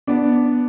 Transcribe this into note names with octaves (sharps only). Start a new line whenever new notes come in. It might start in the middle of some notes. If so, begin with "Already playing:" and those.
B3 D4